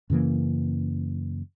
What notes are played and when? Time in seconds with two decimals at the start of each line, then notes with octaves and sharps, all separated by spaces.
0.10 F#2 C#3 E3 A#3